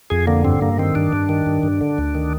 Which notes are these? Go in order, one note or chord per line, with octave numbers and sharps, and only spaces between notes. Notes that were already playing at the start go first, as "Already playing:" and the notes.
F2 G#4
D3 A#3
G2 C4
G2 A#3
D#3 C4
G2 D4
G2
D#3
G2
G2
D3
D2
D#3